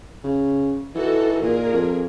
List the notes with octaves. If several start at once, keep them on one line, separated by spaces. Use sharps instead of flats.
C#3
E3 D#4 F#4 A4
A#2 G#4 A#4
F2